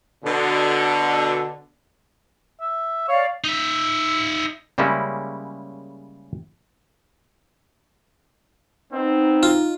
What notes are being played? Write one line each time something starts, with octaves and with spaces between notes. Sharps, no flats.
B2 D3
E5
C#5 D5 F5
D#4 E5
C#3 G3 G#3 A#3 C#4 E4
B3 C4 D#4
F4